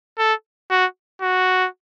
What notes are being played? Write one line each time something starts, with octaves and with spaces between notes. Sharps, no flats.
A4
F#4
F#4